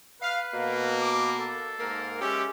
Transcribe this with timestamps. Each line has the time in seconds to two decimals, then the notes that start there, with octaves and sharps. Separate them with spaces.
0.22 B4 F5
0.54 B2 A#3
1.01 D6
1.39 A4
1.79 G#2 A#3 A#4
2.21 G#3 C#4 G4 E5